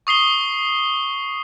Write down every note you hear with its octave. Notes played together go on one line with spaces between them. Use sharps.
C#6 D#6 C7 G7